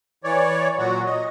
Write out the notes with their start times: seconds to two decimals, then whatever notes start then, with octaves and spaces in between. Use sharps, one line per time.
0.24 E3 C#5 D5
0.78 A#2 F#3 F#4
1.06 D#5